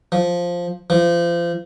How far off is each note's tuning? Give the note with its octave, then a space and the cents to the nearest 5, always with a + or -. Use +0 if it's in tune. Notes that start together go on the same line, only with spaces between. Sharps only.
F3 +5
F3 -30